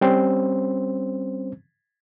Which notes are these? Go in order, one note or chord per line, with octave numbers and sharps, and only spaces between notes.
G3 C4 C#4 C5